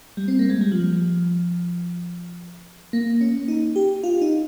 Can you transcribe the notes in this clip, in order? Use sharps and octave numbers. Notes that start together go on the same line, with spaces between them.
G3
C4
A#3
G#3
G3
F3
A#3
C#4
D#4
G4
F4
D#4